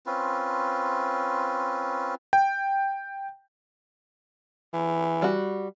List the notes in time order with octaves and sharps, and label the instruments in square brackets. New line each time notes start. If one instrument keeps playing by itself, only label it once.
[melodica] C4 C#4 F4 B4
[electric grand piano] G5
[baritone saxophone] E3
[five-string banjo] G3 F#4